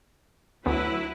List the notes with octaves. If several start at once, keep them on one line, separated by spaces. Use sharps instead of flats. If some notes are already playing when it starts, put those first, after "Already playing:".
D2 F#3 B3 E4 B4